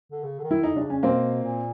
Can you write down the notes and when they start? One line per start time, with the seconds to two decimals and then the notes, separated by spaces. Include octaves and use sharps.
0.12 D3
0.24 C#3
0.39 D3
0.44 D#3
0.51 E4
0.63 D3 D#4
0.75 C3 D4
0.83 C#3
0.90 C#4
1.03 B2 A#3 C4
1.43 A#2